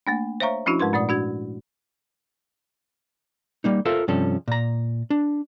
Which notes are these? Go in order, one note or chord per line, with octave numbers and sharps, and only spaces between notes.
A3 A#3 D4
C5 C#5 E5 F5 A#5 C#6
F3 C#4 D4 E4 F#4
G#2 G#3 A#4 B4 C6
A#2 A3 D5 D#6
D4 F#4 G#6
G3 A#3 D#4
F4 A4 A#4 C5 E5 F5
G2 C3 F3 C#4 A4
A#2 A#5
D4